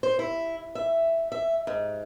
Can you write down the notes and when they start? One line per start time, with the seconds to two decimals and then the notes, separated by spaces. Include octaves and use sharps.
0.03 C5
0.19 E4
0.75 E5
1.32 E5
1.67 G#2